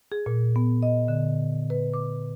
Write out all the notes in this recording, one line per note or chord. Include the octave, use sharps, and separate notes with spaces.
G#4
A#2
B3
D#5
D3
B4
D6